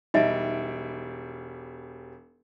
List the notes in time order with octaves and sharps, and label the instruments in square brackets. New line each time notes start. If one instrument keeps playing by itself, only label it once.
[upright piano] E1 G3 D7 [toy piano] D#4 D#5 E5